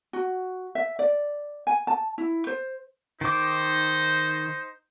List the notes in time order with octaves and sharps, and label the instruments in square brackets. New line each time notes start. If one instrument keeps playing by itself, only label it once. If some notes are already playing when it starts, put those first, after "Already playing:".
[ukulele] F#4
E5
D5
G#5
A5
E4
C5
[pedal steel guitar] D#3 D6 [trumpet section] D#4 C5